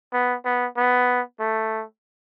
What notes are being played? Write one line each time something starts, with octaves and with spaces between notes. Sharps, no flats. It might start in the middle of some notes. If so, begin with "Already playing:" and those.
B3
B3
B3
A3